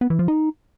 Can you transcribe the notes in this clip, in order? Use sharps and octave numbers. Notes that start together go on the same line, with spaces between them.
B3
E3
F3
D#4